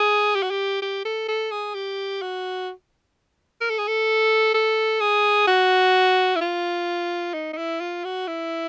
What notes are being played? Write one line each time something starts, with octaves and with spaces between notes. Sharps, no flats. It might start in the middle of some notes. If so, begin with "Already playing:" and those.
Already playing: G#4
G4
F#4
G4
G4
A4
A4
G#4
G4
F#4
A#4
A4
G#4
A4
A4
G#4
F#4
E4
F4
D#4
D#4
E4
F4
F#4
E4